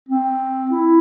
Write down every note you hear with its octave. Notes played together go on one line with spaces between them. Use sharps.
C4
E4